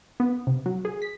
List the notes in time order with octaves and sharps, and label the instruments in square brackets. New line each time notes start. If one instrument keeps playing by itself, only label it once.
[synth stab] B3
C3
F#3
G#4
B6